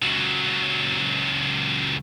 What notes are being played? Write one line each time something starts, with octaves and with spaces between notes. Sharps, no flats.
C#2 F#3